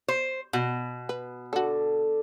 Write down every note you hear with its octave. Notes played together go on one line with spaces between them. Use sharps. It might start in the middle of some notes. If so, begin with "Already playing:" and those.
C5
B2 F#4
B4
D3 F#4 A4